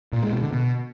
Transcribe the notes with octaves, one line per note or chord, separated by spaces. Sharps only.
A#2
G#3
B2
D3
B2